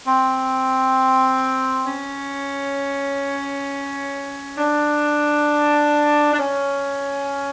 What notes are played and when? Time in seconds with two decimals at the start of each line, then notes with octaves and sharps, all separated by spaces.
0.06 C4
1.86 C#4
4.57 D4
6.33 D4
6.38 C#4